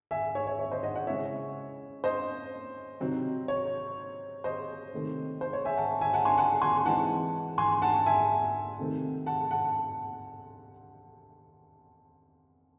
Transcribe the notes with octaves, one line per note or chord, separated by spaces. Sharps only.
E5 G#5
C#5 E5
C#5
C#5
C5 D#5
D#5 F#5
D#5 F#5
C#3 G#3 C#4 E4 C#5 E5
C5 D#5
C3 F#3 C4 D#4
C#5
C5 D#5
C3 D#3 A3 C4
C5
C#5
E5 G#5
F#5 A5
E5 G#5
F#5 A5
G#5 C6
F#5 A5
G#5 C6
E3 G#3 C4 D#4 F#5 A5
G#5 C6
F#5 A5
E5 G#5
C3 D#3 A3 C4
F#5 A5
F#5 A5